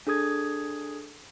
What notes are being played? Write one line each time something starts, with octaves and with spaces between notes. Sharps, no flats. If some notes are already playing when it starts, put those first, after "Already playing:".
D4 G#4 A4 D#6 G#6